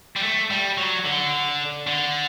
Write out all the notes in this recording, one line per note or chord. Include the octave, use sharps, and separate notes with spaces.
G3
A3
G3
F#3
D3
D3